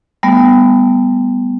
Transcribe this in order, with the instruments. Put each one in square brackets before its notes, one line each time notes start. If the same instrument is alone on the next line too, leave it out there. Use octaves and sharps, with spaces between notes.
[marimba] G3 A3 B3